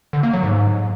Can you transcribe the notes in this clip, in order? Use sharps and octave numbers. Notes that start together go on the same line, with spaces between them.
D3
A#3
F#3
G#2